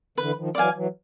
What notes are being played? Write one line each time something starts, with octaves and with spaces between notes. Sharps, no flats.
D3 E3 B4
D#3 F3
E3 F#3 D5 F5 G#5
E3 F#3